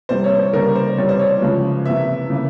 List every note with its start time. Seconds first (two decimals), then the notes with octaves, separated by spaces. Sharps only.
0.09 C3 E3 G3 A#3 C5
0.24 C#5
0.38 C5
0.53 C#3 G3 A#3 A#4
0.75 C5
0.97 C3 E3 G3 C#5
1.09 C5
1.20 C#5
1.42 C#3 F3 G#3
1.86 C3 E3 A#3 E5
2.30 C#3 E3 A#3